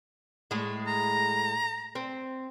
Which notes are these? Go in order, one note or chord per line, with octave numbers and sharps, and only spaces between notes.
A2 G#3
A#5
C4